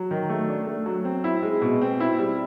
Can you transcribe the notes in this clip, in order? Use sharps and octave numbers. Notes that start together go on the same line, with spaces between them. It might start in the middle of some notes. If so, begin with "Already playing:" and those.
Already playing: F#3
D#3
A3
D4
A3
F#3
C4
E4
G#3
B2
C4
E4
G3